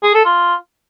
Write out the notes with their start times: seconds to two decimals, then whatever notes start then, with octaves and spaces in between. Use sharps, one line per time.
0.03 G#4
0.14 A4
0.25 F4